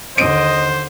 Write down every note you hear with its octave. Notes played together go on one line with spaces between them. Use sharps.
D#2 D3 C5 D#5 D7 D#7